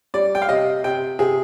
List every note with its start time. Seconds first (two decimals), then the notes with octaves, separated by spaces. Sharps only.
0.14 G3 D5
0.35 G5
0.42 F5
0.49 C3 D#5
0.84 C3 G5
1.19 C3 G#4